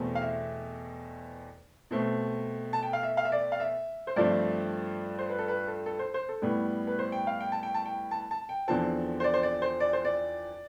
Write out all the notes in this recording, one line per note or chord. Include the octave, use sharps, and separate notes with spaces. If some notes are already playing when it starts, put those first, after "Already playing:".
Already playing: E2 B2 A3 C4
F5
E5
B2 A3 C4
A5
G5
F5
E5
F5
E5
D5
F5
E5
C5
G2 F3 A3 C4 D5
C5
B4
A4
B4
A4
A4
C5
C5
A4
A2 G3 B3
B4
C5
G5
F5
G5
A5
G5
A5
G5
A5
A5
G5
E2 D3 F3 C4 A5
C5
D5
C5
D5
C5
D5
C5
D5